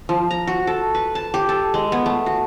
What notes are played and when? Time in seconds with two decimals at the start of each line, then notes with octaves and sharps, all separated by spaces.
0.09 F3
0.31 A#5
0.47 F#4
0.67 A4
0.95 B4
1.15 A5
1.34 G4
1.49 A4
1.74 G#3
1.92 B3
2.06 A3
2.26 F#4